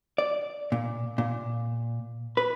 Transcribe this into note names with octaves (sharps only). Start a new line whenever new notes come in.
D5
A#2
A#2
B4